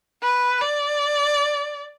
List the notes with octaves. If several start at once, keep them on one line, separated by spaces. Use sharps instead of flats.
B4
D5